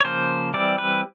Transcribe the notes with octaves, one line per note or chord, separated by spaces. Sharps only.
C#5
C#3 F3 A#3 C5
E3 G3 C4 D5
B4